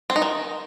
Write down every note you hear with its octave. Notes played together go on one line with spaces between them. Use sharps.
C4
D#4
D#3